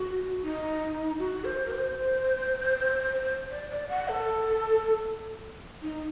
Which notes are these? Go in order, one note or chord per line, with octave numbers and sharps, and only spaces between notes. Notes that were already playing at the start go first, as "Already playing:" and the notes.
Already playing: F#4
D#4
F#4
C5
A#4
C5
D5
D5
F#5
A4
D#4